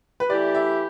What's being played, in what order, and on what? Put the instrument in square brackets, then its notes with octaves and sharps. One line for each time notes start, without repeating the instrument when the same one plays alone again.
[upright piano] B4
[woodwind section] E3 A3 E4 G4 [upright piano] D5
[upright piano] E5